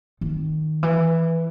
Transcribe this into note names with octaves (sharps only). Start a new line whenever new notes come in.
D#3
E3